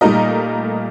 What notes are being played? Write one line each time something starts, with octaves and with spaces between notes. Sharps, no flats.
A#2 G3 A3 D#4 A#4 D#5